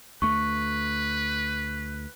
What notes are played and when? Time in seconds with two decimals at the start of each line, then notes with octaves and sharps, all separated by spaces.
0.22 D2 A3 B4 C#6